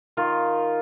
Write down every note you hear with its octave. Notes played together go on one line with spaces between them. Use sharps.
D#3 D#4 F4